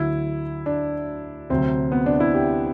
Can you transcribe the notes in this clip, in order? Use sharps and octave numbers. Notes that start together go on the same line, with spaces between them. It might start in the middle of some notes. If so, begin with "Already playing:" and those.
Already playing: D2 D3 F#3 E4
D4
D2 C3 F#3 C4
B3
D4
E4
G4